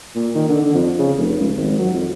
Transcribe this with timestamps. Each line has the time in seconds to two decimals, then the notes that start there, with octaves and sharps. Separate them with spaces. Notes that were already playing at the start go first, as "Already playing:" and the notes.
0.15 A#2
0.35 D#3
0.49 D3
0.61 D3
0.75 F2
0.99 C#3
1.17 F1
1.40 C#2
1.57 G#1
1.78 F#3
1.94 F2